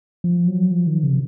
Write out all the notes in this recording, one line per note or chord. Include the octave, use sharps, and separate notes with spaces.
F3
F#3
F3
D#3
C#3
C3